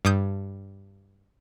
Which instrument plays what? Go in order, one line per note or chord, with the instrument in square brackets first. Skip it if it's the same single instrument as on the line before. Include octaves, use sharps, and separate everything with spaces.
[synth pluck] G2 D6 D#6 G6